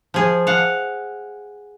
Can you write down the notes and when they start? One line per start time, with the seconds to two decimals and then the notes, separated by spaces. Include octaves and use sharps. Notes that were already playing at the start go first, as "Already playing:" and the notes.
0.14 F3 G#4
0.47 F5 F#5